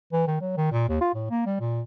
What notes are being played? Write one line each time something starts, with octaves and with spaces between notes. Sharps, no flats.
E3
D#3
F#3
D#3
A#2
D#2
F4
A2
A#3
G3
A#2